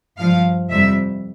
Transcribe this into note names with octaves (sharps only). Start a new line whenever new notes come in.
G2 F3 F5
F2 C3 G3 E5